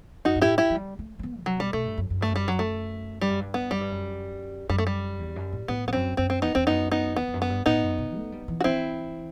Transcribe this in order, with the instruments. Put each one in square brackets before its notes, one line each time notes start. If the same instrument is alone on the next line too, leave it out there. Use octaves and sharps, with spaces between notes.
[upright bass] F#2 [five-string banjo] D#4 F#4
[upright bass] G2
[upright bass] A2 [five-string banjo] E4 G4
[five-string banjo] E4 G4
[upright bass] F#3
G3
A3
A3
B3
C3
[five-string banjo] F#3
[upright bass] B2 [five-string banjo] G3
[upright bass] B2 [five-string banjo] A3
[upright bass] G2
F#2
F#2
[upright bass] G2 [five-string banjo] A3
[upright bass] F#2
[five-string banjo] G3
F#3
A3
[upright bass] G2 [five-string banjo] G3
[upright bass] F#2
G2
[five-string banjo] B3
[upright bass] F#2 [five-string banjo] G3
[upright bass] G2
F#2
[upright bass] F#2 [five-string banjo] G3
[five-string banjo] A3
G3
[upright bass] E2
F#2
A2
[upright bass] A2 [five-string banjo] B3
[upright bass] E2 [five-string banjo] B3
[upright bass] F#2 [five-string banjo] C4
[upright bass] F#2 [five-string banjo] C4
[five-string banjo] C4
[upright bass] E2 [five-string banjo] B3 D#4
[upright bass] E2 [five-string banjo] C4
[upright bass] F#2 [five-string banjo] B3 D#4
[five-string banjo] B3 D#4
[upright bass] E2 [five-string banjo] B3
[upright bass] E2
F#2
[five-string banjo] B3
[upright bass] G2
[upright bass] A2 [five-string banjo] B3 D#4
[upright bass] F#2
C3
A3
G3
E3
[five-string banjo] F#4
[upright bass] E3 [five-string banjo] C4 E4